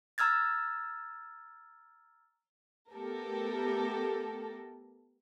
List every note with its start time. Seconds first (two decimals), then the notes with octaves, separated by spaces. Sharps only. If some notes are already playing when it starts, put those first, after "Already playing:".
0.18 A#5 E6 F6 G#6 A6
2.92 A3 B3 G4 A4 A#4